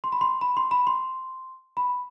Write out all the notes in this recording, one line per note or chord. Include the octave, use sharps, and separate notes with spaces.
C6
B5
C6
B5
C6
B5
C6
B5